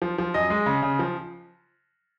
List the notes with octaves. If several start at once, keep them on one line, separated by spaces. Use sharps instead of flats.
F3
F3
F#2 D#5
G#3
C#3
C#3
F3